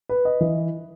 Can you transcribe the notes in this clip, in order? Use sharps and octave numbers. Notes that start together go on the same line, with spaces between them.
B4
D#5
E3